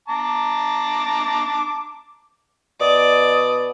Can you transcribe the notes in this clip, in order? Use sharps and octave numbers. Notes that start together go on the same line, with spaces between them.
A5 A#5 D6
B2 D5 D#6